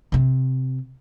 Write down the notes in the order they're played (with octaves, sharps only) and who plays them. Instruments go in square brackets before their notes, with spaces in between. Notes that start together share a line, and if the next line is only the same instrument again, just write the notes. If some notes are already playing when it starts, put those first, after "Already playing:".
[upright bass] C3 C4